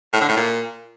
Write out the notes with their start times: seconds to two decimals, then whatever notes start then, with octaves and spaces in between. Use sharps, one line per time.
0.13 A2
0.21 D3
0.29 A2
0.36 A#2